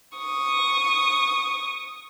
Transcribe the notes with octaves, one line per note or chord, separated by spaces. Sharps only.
C#6 D#6